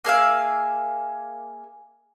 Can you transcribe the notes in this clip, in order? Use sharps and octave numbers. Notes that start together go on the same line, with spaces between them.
A#3 G#4 E5 F5